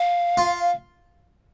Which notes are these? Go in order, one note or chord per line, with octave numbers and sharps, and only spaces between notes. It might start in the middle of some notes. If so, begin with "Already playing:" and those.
Already playing: F5
F4